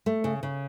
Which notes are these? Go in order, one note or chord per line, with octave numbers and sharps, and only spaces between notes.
A3
C#3
C#3